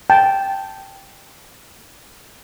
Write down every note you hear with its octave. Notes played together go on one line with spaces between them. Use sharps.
G5 A5